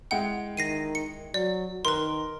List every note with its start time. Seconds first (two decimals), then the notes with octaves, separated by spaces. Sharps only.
0.11 G#3 E4 F#5 G5
0.57 D#3 A#6 C7 D#7
0.95 C#7
1.34 F#3 D5
1.85 D#3 A#4 B4 C6